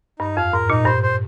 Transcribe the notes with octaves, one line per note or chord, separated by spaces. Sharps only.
G2 D#4
F2 F5
G#2 A#4
A#2 D#4
G2 C5
C5